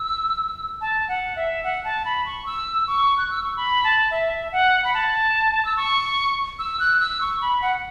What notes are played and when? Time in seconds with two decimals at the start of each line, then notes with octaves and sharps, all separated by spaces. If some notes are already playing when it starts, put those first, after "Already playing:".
Already playing: E6
0.81 A5
1.09 F#5
1.36 E5
1.64 F#5
1.84 A5
2.05 B5
2.26 C#6
2.46 E6
2.87 C#6
3.18 F#6
3.31 E6
3.44 C#6
3.57 B5
3.84 A5
4.11 E5
4.52 F#5
4.84 B5
4.94 A5
5.65 E6
5.77 C#6
6.59 E6
6.79 F#6
7.00 E6
7.21 C#6
7.41 B5
7.62 F#5